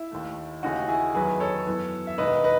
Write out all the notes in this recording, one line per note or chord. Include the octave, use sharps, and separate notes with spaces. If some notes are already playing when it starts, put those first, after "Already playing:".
Already playing: E4
D#2 D#3 A3
D#2 C#3 E3 A3 C#4 D#4 F#4
E4 G#4
E2 D#3 F#3 G#4 B4
A4 C#5
F#2 E3 B3
E5
E1 D#2 D#3 B4 D#5
B4 D#5